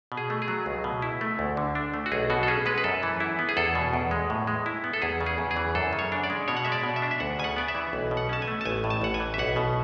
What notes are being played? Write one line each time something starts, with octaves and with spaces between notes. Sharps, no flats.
B2
G#4
A3
G#4
F#3
C#2
B2
E4
A3
D2
D3
D4
A3
F#4
B1 G#4
B2 F#4
A4
C#4 G#4
G#3 B4
B4
F#2 A4
E3
E4
B3
G#4
E2 A4
B2
E2
G#3
A2
G#3
E4
B3
A4
E2 G#4
C#3
G#4
E2
G#4
E3
F#2 A4
C#3
C#5
D4
D5
G#3
B2 C#5
F#5
G#3 E5
D5
B2
E5
D4
E5
D2 F#5
C#3 G#5
F#5
B3 D5
E5
E3
B1
B2
F#5
C#4 A5
G#5
A3
A5
A1 G#5
A2
A5
A1 F#5
G#5
E3
E5
B1 F#5
B2